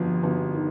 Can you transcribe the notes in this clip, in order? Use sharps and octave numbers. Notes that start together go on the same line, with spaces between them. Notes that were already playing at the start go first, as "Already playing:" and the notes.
Already playing: G1 F2
G1
D#3